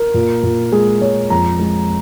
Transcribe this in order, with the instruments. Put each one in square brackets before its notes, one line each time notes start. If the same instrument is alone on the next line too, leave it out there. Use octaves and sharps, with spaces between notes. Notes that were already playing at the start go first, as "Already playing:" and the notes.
Already playing: [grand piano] A#4
A#2
A#2
G#3 G#4
G#3 C#5
F2 A#5
G#3